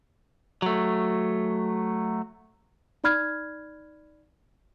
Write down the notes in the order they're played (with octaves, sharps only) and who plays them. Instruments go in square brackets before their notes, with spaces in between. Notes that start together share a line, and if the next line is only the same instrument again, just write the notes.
[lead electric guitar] F#3 A3
[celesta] D#4 D5 B5 F6 G#6